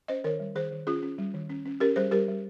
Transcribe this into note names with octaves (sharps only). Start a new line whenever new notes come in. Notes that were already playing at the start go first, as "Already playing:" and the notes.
C#4 C5 D#5
D#3 A#4 C#5
G3
D#3 G#4 C5
D#3
C#4 F4 G#4
C#4
G3
D#3
C#4
C#4
C#4 G4 A#4
G3 G#4 C5
G3 G4 A#4
G3